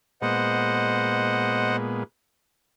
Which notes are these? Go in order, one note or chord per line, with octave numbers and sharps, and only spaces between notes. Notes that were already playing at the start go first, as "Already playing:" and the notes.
A#2 G#3 B3 C5 D#5 F#5